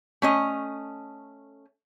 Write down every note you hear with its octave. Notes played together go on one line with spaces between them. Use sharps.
A3 C#4 D#5